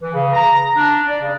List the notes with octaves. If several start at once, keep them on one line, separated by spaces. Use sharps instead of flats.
E3
C#3
A#5
D4
D5
C#3